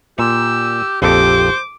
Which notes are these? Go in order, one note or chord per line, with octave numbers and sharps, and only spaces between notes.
A#2 G4 E6
A#1 F2 G4 A4 C5 D6